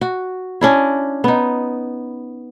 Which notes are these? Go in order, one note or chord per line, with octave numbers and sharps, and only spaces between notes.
F#4
C#4 D4 E4
B3 D#4